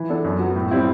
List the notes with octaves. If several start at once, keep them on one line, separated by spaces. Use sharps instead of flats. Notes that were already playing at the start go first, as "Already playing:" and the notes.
Already playing: E3
B3 D4 A4
F#2
F#3 B3
A2
G3 C4 E4